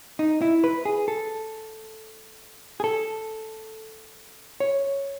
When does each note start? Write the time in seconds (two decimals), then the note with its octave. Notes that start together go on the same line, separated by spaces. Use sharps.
0.19 D#4
0.42 E4
0.64 B4
0.85 G#4
1.08 A4
2.80 G#4
2.84 A4
4.60 C#5